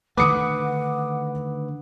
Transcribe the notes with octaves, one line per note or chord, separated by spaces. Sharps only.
D3 D#3 A3 B4 F#5 D6 D#6 C#7